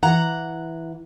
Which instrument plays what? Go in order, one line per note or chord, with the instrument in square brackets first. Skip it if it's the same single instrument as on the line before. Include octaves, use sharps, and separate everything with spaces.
[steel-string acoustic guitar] E3 F#5 A#5